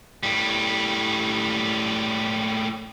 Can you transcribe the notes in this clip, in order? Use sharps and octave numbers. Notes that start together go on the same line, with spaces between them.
A2 G3